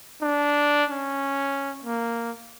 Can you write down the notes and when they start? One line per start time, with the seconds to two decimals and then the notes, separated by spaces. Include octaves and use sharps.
0.22 D4
0.91 C#4
1.84 A#3